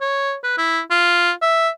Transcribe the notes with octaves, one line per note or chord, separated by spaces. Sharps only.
C#5
B4
E4
F4
E5